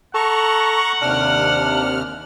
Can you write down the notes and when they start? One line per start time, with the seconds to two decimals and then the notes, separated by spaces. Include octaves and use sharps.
0.15 A4 F#5 A#5 C#6
1.02 D#2 C3 D4 F6